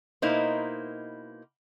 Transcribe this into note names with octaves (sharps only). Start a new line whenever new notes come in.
B2 A#3 D#4 E4 B4 C5